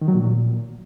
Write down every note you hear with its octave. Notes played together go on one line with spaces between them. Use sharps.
D#3
F#3
A#2